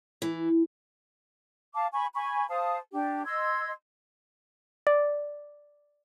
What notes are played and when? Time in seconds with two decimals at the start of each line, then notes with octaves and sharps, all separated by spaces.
0.22 E3
1.74 F5 A5 D6
1.93 G#5 B5 C#6
2.15 G#5 B5 C#6
2.49 C5 F5 A5 D#6
2.92 D4 G4
3.26 D#5 C6 E6 G#6
4.87 D5